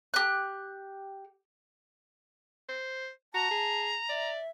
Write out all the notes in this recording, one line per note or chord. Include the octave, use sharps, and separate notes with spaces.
G4 F#6
C5
F#4 A5 A#5
G#4
D5 E5